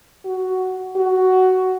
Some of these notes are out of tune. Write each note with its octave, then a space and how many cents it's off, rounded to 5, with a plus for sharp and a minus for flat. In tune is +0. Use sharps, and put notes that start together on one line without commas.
F#4 +10
F#4 +10